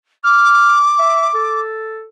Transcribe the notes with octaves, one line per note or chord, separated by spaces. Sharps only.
D6 F6
E5
A4